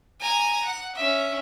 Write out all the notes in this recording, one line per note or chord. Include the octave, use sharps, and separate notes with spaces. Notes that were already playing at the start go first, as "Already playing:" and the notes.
G#5 A#5
F#5
C#4 E5